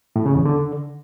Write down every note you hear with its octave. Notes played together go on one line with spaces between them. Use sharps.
A2
C#3
E2
D3